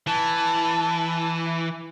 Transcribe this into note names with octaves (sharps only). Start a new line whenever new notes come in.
E3 A5